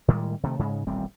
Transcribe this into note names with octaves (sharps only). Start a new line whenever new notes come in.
A2 D#3 G3 G#3
C3 D#3 A3
G#2 C#3 G#3
D#1 A1 G3 C4